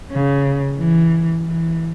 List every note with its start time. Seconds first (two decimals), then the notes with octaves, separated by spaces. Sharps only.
0.12 C#3
0.79 E3
1.46 E3